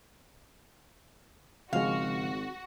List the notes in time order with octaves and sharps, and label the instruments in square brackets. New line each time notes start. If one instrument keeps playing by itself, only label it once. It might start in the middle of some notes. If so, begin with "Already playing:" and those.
[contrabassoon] G#1 [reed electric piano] C#3 F3 G#3 [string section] F#4 [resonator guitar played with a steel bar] F5